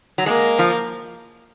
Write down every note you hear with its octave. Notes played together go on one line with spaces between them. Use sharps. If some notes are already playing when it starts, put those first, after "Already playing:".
F#3
G#3 A#3
F3